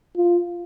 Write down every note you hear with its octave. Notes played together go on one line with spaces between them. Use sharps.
F4